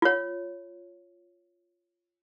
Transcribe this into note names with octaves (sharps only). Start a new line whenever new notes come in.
F4 C#5